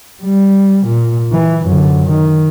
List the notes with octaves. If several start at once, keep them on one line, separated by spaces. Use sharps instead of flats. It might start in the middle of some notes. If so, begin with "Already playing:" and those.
G3
A#2
E3
F#2 D3
D#3